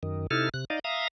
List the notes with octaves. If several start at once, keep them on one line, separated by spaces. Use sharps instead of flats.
F#2 D#3
C3 D#4 E4 A4 F6
C3 F#6
D#4 D5 D#5 F5
E5 F5 A#5 D#6